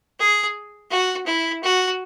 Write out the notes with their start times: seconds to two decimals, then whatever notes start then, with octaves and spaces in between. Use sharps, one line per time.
0.19 G#4
0.91 F#4
1.26 E4
1.63 F#4